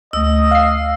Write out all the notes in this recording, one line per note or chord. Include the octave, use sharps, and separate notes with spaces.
D2 A3 D#5 E6
F5 C7